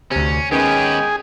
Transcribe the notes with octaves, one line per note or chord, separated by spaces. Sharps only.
D2 C3 C#4
D#3 G#3 B3 C#4 G4 G#4 B4 G5